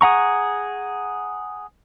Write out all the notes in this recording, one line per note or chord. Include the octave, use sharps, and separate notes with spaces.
G#4 F#5 A#5 C#6